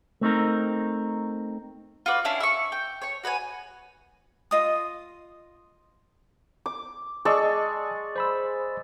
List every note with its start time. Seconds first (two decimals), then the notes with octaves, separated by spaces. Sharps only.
0.21 A3 C4 D#4 A#4
2.06 F4 F#4 B4 D5
2.25 C#4 D4 E4 F5
2.40 E5 C#6
2.72 G5
3.02 C#5 C#6
3.24 F#4 B4 C#5 G#5
4.51 F4 D#5 D#6
6.66 D6
7.25 G#3 D5 D#5 A5 C#6 E6
8.16 C5 B5 E6